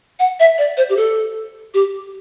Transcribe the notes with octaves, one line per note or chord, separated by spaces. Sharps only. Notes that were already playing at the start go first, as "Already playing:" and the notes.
F#5
E5
D5
C5
G4
A4
G4